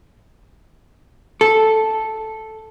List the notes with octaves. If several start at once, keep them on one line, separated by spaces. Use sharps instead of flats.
A4